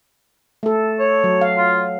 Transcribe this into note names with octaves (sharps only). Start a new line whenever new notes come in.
A3 A4
C#5
F#3
F5
F4